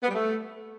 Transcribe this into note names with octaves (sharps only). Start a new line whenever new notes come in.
B3
G3
A3